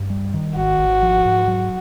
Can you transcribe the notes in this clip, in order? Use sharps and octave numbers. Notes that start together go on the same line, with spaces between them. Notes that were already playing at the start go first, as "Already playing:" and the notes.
Already playing: G2
G3
D#3
G#1 F#4
G#1
F3
G#2
F#3